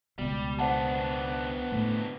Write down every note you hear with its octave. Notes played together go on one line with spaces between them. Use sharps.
C#2 B2 G3
B3 D4 C5 F#5 A5
A2 A3